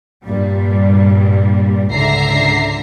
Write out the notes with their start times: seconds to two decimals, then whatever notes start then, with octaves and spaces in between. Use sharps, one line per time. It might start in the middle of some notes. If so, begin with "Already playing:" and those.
0.24 G2 A#2 G3
1.92 C#2 G#2 D3 E5 A#5 C7